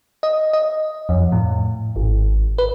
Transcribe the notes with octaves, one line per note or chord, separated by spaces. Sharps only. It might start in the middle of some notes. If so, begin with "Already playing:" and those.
D#5
D#5
F2
A2
G#1
B4